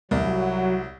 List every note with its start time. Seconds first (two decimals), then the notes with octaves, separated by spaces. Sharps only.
0.11 C2 F#3